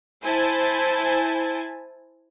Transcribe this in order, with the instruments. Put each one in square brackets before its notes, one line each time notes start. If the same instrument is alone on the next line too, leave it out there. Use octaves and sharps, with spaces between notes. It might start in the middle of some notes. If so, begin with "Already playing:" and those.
[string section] E4 C5 G#5 A5